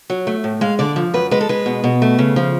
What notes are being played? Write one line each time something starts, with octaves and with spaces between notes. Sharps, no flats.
F#3
A3
A2
G#3 F5
D3 D5
F3
F#2 B4
G#3 B4
A4
G#3 B4
B2
B2
A3
C#3
F3